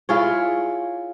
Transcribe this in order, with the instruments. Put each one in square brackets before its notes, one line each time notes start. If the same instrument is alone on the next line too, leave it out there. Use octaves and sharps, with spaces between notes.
[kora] E4 F4 G#4 C#5